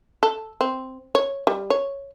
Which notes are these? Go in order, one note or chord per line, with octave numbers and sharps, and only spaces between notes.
A4
C4
C#5
G3
C#5